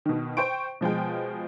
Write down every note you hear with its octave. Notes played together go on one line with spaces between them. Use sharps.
B2 D#3
C5 G5 C#6 D7
B2 F3 G#3 G5